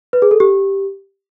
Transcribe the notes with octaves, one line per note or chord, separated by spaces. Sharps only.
B4
G#4
A4
G4